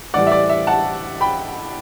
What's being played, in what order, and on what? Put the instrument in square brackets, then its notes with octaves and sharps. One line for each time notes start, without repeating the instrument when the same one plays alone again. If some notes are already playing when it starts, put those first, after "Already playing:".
[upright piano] A2 E3 G3 D5 F#5
E5
D5
E5
F#5 A5
G5 B5